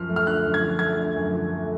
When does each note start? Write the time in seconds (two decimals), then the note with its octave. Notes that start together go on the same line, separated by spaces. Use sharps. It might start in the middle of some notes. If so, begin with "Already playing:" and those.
Already playing: F#2 F3 F6
0.09 A3
0.16 F6
0.27 D3 F#6
0.45 F#2
0.54 G#6
0.63 F3
0.79 A3 G#6
0.98 D3
1.16 F#2
1.34 F3
1.52 A3